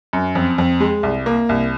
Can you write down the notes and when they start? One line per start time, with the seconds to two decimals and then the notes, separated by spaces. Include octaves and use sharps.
0.13 F#2
0.35 F2
0.58 F2
0.80 G#3
1.03 C2
1.26 A#3
1.49 C2